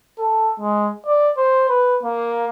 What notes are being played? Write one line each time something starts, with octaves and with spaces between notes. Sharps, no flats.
A4
G#3
D5
C5
B4
A#3